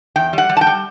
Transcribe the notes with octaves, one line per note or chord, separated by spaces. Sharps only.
E2 G5
G3 F#5
G3
A5
G5
G3